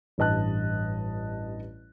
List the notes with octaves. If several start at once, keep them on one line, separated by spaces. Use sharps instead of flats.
A1 G2 D#5 A5 F#6